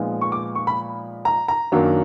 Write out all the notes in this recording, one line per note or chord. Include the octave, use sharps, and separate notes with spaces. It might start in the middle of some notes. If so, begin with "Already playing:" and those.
Already playing: A#2 F3 G#3 B3 D#4
C#6
D6
C#6
B5
A#5
A#5
F#2 D#3 F#3 A#3 D4